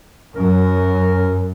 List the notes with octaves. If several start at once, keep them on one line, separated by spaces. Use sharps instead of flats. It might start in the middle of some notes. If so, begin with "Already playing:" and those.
F#2 C#4 A#4